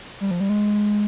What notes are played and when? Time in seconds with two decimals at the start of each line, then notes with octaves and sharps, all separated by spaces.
0.21 G3
0.31 F3
0.40 G3
0.49 G#3